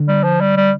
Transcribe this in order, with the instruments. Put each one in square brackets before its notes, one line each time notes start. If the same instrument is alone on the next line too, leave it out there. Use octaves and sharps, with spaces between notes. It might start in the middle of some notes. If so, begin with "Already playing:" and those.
Already playing: [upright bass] D3
[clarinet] G3
F3
G3
G3